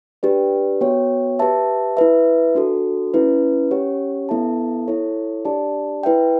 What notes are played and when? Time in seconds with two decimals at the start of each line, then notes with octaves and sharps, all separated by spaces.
0.23 D4 G4 B4 D5 G5
0.81 B3 F#4 C#5 G5
1.39 G4 B4 E5 A5
1.97 E4 B4 E5
2.55 D4 F#4 A4
3.14 C#4 E4 B4
3.71 C#4 G4 C#5 F#5
4.29 B3 E4 A4 E5 A5
4.88 E4 A4 C#5
5.45 D4 G4 D5 A5
6.03 E4 B4 E5 G5